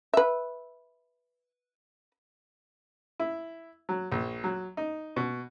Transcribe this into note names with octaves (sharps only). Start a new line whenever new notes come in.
B4 E5
E4
F#3
A#1
F#3
D#4
B2